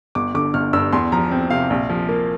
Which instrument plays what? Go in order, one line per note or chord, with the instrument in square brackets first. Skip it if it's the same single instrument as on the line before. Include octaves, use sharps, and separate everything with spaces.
[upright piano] G1 D6
D3 D6
G1 F6
G2 E6
E2 C6
F3 A#5
C4
C3 F5
A#1
F3
A#3